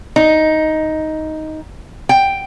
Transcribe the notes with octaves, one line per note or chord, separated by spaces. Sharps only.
D#4
G5